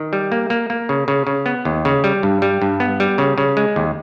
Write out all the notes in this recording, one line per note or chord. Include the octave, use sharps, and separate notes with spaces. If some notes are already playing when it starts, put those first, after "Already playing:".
Already playing: D#3
G3
A#3
A#3
A#3
C#3
C#3
C#3
B3
D#2
C#3
G3
G2
G3
G2
B3
G3
C#3
C#3
G#3
D#2